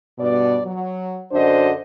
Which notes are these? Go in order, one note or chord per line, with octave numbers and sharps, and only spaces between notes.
G2 B2 D5
F#3
F#2 D3 D4 F#4 C5 D#5